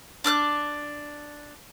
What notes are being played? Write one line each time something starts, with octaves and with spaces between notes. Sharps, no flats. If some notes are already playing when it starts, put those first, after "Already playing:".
D4 D6 F6 F#6